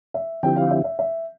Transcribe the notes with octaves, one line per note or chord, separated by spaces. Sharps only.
E5
D3 F3 C4 E4 G4 G5
F5
E5
E5
E5